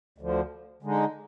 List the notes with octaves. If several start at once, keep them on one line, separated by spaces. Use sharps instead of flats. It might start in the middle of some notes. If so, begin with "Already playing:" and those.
D2 D3 F3
D3 G#3 D#4